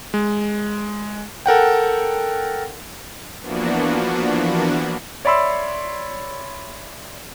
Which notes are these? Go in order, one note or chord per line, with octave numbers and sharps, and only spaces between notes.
G#3
A4 A#4 F#5 G5
E3 F3 A#3 B3 D4 F#4
C#5 D5 E5 B5 C6 E6